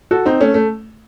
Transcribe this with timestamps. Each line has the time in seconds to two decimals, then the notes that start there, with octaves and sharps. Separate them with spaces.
0.11 F#4 A4
0.26 C4 D#4
0.41 A3 C#4
0.54 A3